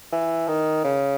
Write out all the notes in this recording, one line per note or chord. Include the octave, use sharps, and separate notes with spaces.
E3
D#3
C#3